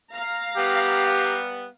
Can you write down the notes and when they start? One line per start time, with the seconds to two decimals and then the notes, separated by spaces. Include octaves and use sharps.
0.11 F5 A#5
0.57 G3 B3 G4